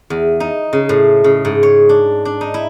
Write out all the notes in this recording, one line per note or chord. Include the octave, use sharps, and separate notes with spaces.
E2
D#4
C#3
A2
C#3
G#2
C#5
D4
D4
D#4
E4